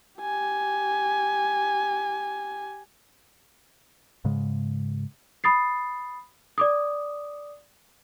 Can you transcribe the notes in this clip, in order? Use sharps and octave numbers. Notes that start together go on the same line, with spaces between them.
G4 G#5
G#2 C#3 G#3
B5 D#6 A6 C7
D5 D6 D#6